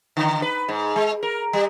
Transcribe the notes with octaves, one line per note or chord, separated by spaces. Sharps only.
D3
B4
G#2
G#3
A#4
G3